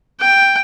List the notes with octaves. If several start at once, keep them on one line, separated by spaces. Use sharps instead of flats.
G5